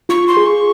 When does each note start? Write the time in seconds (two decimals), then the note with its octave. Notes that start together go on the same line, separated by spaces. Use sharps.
0.09 F4 C#6
0.27 C6
0.37 G#4
0.46 C#6